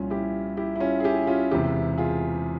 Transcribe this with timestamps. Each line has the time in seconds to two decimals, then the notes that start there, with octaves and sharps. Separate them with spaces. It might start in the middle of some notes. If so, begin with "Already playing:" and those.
Already playing: C2 A#2 F3 C#4 F4
0.10 E4 G4
0.57 E4 G4
0.76 E4
0.80 C#4 F4
1.00 G#4
1.04 E4 G4
1.27 C#4 F4
1.51 E1 E2 C3 E4 G4
1.98 F4 G#4